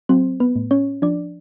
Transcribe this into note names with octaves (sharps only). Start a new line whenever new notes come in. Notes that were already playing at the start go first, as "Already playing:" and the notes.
F#3 C4 C5
B3 B4
A2
C#4 C#5
F3 D4 D5